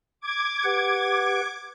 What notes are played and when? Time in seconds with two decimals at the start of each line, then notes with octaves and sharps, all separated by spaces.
0.20 D6 G#6
0.63 G4 B4 F#5